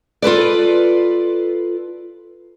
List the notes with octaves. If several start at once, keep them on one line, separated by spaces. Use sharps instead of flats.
F4 A4 B4 D5